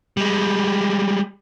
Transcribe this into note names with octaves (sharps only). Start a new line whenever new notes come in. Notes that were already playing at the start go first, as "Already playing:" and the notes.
G3 G#3